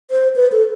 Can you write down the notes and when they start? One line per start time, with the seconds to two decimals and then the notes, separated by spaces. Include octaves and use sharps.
0.11 C5
0.36 B4
0.52 A4